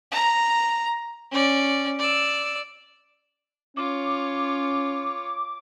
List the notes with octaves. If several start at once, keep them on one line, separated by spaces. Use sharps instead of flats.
A#5
C#4 D5
D5 E6
C#4 F4 C#5 D6